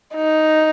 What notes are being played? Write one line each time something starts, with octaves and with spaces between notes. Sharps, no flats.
D#4